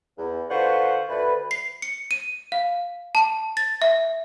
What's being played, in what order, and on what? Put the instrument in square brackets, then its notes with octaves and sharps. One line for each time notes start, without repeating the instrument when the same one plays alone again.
[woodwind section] E2
D3 F4 B4 C5 F#5 C#6
D2 B4
[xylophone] C7
C#7
D#7
F5
A5
A6
E5